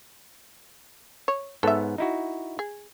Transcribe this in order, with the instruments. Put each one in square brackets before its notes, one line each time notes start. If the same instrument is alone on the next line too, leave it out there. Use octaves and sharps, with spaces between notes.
[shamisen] C#5
[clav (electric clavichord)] G#2 B3 C#5 [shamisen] A4 E5
[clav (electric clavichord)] D#4 E4 F#4
[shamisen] G#4